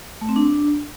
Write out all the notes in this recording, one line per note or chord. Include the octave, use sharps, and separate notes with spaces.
A3
C4
D4